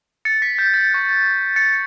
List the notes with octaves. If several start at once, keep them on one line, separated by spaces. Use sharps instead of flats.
A6 C#7
B6
G6
A6
C#6 F#6
A6 C#7